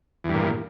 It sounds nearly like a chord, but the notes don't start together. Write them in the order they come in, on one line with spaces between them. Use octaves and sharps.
E2 G2 A#2